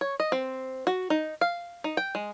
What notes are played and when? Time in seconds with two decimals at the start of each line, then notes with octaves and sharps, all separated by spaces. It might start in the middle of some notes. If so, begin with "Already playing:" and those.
0.01 C#5
0.20 D#5
0.32 C4
0.87 F#4
1.10 D#4
1.41 F5
1.84 D#4
1.97 G5
2.15 G#3